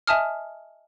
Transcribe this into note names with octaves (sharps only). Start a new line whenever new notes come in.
D#5 E5 G#5 A5 D#6 F6